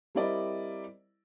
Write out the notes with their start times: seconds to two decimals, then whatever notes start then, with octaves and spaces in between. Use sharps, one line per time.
0.15 G3 C4 E4 A#4 D5 D#5